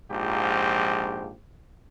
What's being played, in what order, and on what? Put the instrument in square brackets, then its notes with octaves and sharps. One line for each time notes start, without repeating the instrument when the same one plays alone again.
[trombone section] A#1 G#2 F3 G4